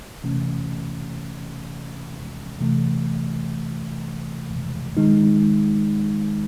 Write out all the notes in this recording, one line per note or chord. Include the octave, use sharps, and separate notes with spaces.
C3 E3 A3 C#4
C3 E3 A3
D#3 G#3 D#4